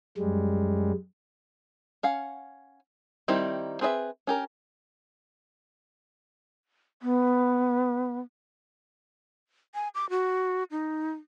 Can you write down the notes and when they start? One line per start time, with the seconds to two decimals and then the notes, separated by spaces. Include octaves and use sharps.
0.18 F#2 G3 G#3
2.03 C#4 F5 F#5
3.28 D#3 G3 C4 D#4 E4
3.81 C4 G#4 B4 D#5 E5
4.27 C#4 G4 A#4
7.02 B3
9.75 G#5
9.95 D6
10.10 F#4
10.71 D#4